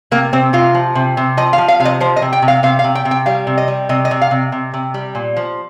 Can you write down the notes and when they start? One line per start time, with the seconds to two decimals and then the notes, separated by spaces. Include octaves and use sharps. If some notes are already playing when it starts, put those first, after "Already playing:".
0.11 C3 A#3
0.33 C3 C4
0.53 C3 F4
0.74 F3
0.95 C3
1.17 C3
1.37 F3 D#5
1.53 F5
1.58 F3
1.68 F5
1.80 C3 F5
1.85 D#5
2.00 F3 C5
2.16 D#5
2.22 C3
2.33 G5
2.42 C3
2.48 F5
2.63 C3 F5
2.79 F5
2.84 C3
2.95 G5
3.05 C3
3.11 G5
3.26 G3 F5
3.47 C3
3.58 D#5
3.68 G3
3.89 C3 D#5
4.05 D#5
4.11 C3
4.22 F5
4.31 C3
4.52 C3
4.74 C3
4.94 G3
5.15 A#2
5.37 F3